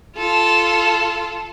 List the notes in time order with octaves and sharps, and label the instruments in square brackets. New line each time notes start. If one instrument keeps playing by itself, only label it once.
[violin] F4 A4